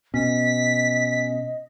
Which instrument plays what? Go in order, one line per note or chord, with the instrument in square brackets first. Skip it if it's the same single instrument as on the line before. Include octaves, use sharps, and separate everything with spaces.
[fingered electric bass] B2 [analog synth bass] C#4 [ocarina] D#5 [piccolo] B6